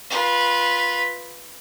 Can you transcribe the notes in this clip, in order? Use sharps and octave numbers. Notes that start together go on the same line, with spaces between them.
F4 B4